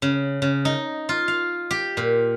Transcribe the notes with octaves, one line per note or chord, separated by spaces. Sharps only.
C#3
C#3
D#4
F4
F5
G4
A#2